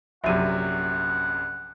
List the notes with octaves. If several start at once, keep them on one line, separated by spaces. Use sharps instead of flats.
A#1 F#2 C3 E5 F#5 D#7